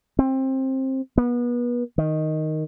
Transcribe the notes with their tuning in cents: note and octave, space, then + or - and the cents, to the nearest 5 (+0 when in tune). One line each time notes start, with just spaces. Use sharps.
C4 +20
B3 -30
D#3 +0